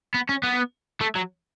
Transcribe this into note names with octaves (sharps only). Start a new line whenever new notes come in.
B3
C#4
B3
A3
F#3